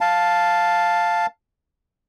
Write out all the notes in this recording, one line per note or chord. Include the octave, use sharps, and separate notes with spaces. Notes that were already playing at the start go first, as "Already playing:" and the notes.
F5 A5